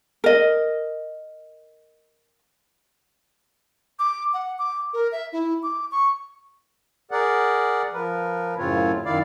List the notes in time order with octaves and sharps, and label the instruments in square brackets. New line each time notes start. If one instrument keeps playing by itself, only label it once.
[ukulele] A#4 D#5
[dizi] D6
F#5
D6
A#4
E5
E4
D6
C#6
[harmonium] G#4 A#4 D5 F#5
F3 A#4 B4
F#2 A2 C#3 C4 F4 C#5
F#2 D#3 E4 D5 F5